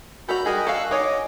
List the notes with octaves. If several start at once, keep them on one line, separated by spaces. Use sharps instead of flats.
F#4 A4 A#5 B5 G6
G3 F#4 G#4 A#4 D#5 G#5
A4 F5 C#6 E6 F#6
D#4 F#4 C#5 D#5 G#5 D6